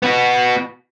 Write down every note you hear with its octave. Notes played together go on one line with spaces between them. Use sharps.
B3 F#4